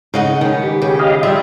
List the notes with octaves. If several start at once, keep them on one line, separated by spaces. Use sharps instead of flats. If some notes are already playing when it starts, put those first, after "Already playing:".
G#2 C#3 D#4 F#5
D#3 G#3 B3 C#4
G4
C#3
G4 D#5 F5
G3 F4 G#4 E5